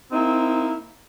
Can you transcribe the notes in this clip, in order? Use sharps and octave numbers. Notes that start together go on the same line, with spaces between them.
A#3 C4 D#4 E4